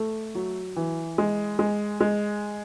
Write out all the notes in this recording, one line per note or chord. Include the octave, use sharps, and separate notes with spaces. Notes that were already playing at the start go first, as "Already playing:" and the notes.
Already playing: A3
F#3
E3
G#3
G#3
G#3